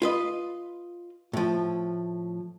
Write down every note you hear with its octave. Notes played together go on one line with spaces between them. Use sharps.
F4 B4 D#5
A2 F3